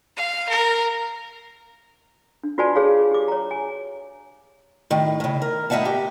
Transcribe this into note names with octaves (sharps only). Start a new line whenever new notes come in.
F5
A#4
D4
F4 F#4 B4 D5 G#5 A5
G#4 B4 C#5 F5
G4 D6
C#5 A#5
G#5
A2 D#3
A2 C#3
A#4
A2 D#4 E5 F#5 A5
G4